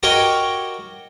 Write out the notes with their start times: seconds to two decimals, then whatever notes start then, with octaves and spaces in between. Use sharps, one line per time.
0.03 F#4 G4 A#4 C#5 D#5 G5